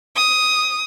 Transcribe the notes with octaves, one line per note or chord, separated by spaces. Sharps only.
D#6